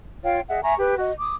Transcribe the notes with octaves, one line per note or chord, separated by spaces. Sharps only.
F4 C#5 F5 G5
G#4 D#5 E5 F#5
E5 G#5 A#5 C#6
G4 B4
F#4 D#5
D6 D#6